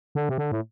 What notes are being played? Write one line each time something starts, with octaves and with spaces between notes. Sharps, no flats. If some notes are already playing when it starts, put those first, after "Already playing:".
D3
C3
D3
A2